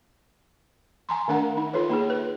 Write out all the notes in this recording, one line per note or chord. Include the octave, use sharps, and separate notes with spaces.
G#5 A#5 C6
D#3 A3 D4 A#4 F#5 A#5
D#4
F4 A4 B4 C#5
A#3 D#4 G#4
B4